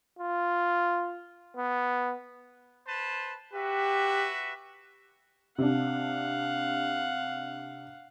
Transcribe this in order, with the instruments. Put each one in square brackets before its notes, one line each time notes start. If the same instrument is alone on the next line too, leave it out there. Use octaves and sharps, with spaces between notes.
[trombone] F4
B3
[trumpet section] B4 C5 A5
[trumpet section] F#4 B4 E5 [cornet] G4
[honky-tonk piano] C3 D4 [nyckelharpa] F5 F#5